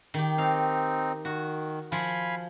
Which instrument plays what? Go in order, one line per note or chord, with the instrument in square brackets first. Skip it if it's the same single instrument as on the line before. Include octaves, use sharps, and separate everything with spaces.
[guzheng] D#3 G4
[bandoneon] C4 D#4 [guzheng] F5
[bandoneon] D#3 [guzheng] F#4
[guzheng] F3 [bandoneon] F5 G#5 B5